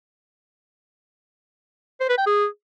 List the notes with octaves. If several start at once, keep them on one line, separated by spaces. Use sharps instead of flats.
C5
B4
G5
G#4